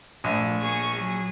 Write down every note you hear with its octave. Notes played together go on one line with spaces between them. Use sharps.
A#1 A3
A#3 G#4 C#6
F#3 G#4